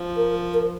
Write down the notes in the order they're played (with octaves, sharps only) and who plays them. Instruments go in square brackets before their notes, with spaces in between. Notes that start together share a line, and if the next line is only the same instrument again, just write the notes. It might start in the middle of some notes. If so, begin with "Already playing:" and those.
Already playing: [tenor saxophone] F3
[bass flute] A#4
A#4